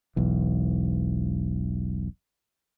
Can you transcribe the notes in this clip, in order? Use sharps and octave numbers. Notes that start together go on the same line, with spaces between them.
E1 B1 E3